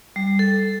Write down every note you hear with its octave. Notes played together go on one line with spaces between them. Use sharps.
G3
A4